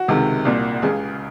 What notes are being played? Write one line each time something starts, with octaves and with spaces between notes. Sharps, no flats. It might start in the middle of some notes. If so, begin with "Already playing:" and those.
Already playing: F#4
C#2 C3 D#3
C2 A#2
C#2 C#3 G#4